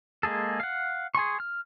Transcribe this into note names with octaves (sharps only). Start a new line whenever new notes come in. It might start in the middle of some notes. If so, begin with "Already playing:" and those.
G#3 A#3 G#4 A4
F5 F#5
G#4 G#5 C6 C#6
F6